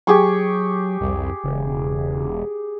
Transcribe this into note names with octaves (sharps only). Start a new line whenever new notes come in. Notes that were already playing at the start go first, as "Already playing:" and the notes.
F#3 G4 G#4 C#6
C2 F2
E1 C#3